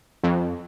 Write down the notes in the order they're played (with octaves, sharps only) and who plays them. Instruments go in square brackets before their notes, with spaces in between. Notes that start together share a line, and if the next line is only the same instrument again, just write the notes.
[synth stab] F2